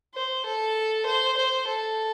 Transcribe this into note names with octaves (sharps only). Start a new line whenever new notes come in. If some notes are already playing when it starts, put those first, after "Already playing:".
C5
A4
C5
C5
A4